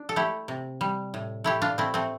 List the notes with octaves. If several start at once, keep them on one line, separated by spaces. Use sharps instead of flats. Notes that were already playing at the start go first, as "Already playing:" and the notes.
Already playing: D4
A4
A3 E4 G4
C3
G3
A2
A3 E4 G4
D4 F4
A3 C4 E4
A3 C4